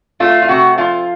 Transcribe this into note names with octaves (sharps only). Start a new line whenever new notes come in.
A3 F4
F4
C3 F#4
F3 F4